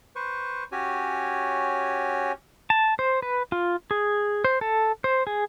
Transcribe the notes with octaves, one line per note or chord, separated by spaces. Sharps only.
B4 C5 C#6
C#4 F#4 G4 C#5 G#5
A5
C5
B4
F4
G#4
C5
A4
C5
G#4